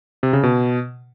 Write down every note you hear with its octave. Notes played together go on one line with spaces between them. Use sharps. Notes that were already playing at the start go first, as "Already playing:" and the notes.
C3
C#3
B2